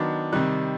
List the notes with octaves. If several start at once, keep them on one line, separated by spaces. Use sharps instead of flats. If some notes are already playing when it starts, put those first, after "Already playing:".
Already playing: D#3 F#3 B3 D4
C3 D#3 G3 F#6